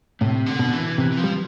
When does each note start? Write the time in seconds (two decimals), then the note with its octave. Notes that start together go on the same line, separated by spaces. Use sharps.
0.21 A2 C3
0.46 D3
0.59 B2
0.73 E3
0.98 C3 E3
1.12 E3
1.17 F3
1.24 G3